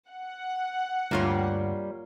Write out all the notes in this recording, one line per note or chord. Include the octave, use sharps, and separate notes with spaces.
F#5
D2 G2 G3 A#3 F4 C#5